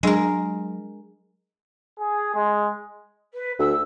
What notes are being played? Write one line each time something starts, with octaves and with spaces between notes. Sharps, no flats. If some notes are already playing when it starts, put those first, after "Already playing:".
F#3 G#3 D4 G#4 A#4 D#5
G#4
G#3
B4
D2 E6